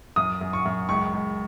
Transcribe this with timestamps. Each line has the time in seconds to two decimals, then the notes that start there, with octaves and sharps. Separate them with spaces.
0.16 F#2 D#6
0.41 F#2
0.53 C#6
0.65 F#2
0.89 C#2 C#6
1.13 C#2